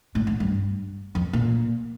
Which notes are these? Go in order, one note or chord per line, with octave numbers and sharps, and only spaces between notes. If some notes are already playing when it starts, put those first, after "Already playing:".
A2
A2
G2
F2
A#2